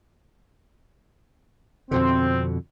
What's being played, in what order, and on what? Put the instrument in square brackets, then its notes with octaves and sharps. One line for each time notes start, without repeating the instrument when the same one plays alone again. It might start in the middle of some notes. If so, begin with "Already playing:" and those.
[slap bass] F2 B2 D3 [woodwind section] C4